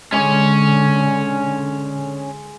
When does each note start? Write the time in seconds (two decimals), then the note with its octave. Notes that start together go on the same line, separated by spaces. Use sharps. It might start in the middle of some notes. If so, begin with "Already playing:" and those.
0.13 D3 G#3 C#4 C#5 D6